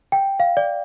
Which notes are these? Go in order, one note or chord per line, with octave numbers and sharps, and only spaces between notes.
G5
F5
D5